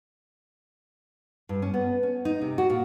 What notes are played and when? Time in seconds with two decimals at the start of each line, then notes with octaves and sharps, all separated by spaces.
1.49 G2
1.62 C#4
1.74 B3
2.03 C#4
2.25 D#4
2.41 C3
2.58 F#4
2.70 A#2